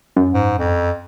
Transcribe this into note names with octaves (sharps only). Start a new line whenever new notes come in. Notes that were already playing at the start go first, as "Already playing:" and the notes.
F#2
G#2
F2